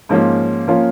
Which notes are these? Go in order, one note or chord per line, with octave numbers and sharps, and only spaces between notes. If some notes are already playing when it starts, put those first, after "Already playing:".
G#2 F3 A#3 C#4 F4
F3 A#3 C#4 F4